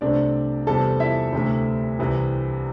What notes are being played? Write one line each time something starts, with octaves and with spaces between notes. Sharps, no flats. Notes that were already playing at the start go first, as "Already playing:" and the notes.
C2 C3 A3 C4 D4 D5
E2 C3 G3 C4 A4 A5
E4 E5
D2 C3 A3
C2 C3 E3